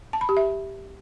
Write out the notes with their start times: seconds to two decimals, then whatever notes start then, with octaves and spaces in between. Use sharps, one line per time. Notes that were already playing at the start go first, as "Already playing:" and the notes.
0.13 A5
0.21 B5
0.29 G4
0.37 E5